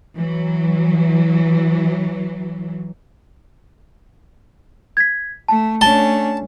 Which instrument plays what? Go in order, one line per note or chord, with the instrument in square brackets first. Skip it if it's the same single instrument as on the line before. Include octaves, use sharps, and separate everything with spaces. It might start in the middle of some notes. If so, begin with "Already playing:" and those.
[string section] E3 F#3
[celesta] G#6 B6
[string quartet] A3 [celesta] A5
[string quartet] A3 C#4 D4 [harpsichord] A5 [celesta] G7